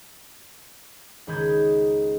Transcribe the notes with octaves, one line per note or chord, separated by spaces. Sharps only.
C#2 D#3 B5 D#6 G6 G#6